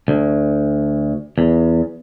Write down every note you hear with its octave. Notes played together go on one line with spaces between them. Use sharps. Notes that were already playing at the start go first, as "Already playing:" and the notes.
D2
E2